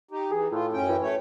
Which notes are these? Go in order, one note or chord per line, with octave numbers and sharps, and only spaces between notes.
D#4 G4
E3 G#4
A2 F4
F#2 C#4 G5
E3
A3 C#5